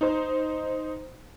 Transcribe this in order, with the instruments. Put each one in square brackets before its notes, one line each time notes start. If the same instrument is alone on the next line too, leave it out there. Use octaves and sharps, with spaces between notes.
[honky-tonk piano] D#4 C5